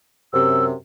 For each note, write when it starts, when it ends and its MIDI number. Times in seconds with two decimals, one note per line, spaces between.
0.33 0.73 42
0.33 0.73 48
0.33 0.65 88